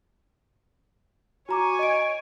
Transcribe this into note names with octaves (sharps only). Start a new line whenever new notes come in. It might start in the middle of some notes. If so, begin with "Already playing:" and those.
F#4 C#5 G#5 A#5 D6
D#5 D7